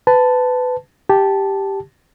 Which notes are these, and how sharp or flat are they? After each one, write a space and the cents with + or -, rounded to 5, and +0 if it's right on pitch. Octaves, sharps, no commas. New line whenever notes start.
B4 +25 A5 +0
G4 +0 A5 -10